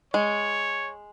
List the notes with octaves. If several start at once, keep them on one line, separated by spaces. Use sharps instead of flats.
G#3 C#5